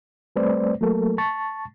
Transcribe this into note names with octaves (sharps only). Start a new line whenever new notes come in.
G3 A3 C4 B4 C5 D5
F#3 A3 A#3 A4 A#4
A5 C#6 A6